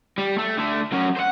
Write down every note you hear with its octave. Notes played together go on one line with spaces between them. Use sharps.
G3
A3
D3 A3
F#3 C#4
C5 F#5